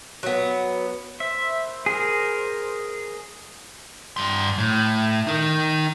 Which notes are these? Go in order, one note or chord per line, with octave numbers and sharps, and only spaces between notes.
F#3 B3
C5 E5
G#4 A#4
G2 C6
A2
D#4 A#4